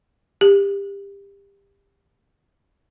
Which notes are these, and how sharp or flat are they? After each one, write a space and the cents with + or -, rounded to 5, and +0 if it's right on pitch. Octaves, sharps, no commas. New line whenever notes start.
G4 +25